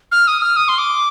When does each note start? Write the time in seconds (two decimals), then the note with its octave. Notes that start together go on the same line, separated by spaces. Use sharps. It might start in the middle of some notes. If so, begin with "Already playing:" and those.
0.12 F6
0.27 D#6
0.42 F6
0.56 D#6
0.68 C6
0.78 D6